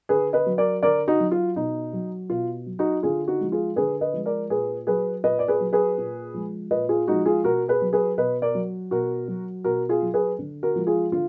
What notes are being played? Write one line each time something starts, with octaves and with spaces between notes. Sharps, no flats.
D3 G#4 B4
B4 D#5
F#3
A#4 D5
D3 A#4 D5
D#4 F#4
F#3
F4
B2 D#4
F#3
B2 F4
F#3
D#4 F#4
D3 F4 G#4
D#4 F#4
F3 G#3
F4 G#4
D3 G#4 B4
B4 D#5
F3 G#3
A#4 D5
A#2 G#4 B4
F#3 G#4 B4
A#2 B4 D#5
D5
G#4 B4
F#3
G#4 B4
A#2
F3 G#3
A#2 B4 D#5
F4 G#4
F3 G#3 D#4 F#4
F4 G#4
B2 F#4 A#4
G#4 B4
F#3
G#4 B4
B2 B4 D#5
A#4 D5
F#3
B2 F#4 A#4
F#3
B2 F#4 A#4
F4 G#4
F#3
G#4 B4
D3
F#4 A#4
F3 G#3
F4 G#4
D3 F4